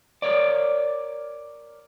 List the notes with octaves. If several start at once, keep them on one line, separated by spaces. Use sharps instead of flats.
A#4 C#5 D5